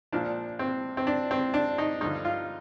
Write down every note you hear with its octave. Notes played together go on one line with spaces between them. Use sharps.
A#1 A#2 F3 D4
C4
C4
D4
C4
D4
D#4
G2 D3 F3 D#4
F4